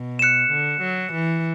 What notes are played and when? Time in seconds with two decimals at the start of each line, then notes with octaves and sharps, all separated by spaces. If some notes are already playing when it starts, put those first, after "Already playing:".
Already playing: B2
0.19 F#6 C#7 E7
0.50 D3
0.82 F#3
1.13 E3